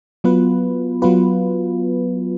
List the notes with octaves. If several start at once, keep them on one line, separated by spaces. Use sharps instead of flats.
F#3 B3 F4 B4
F#3 B3 F4 B4